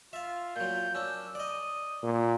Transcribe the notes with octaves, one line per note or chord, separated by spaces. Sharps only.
F4 E5 F5
A#2 F#3 G6
C#4 D4 E6
D5 D#5 D#6
A#2